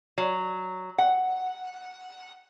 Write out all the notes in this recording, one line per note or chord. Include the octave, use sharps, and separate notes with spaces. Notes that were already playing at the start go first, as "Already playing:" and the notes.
F#3
F#5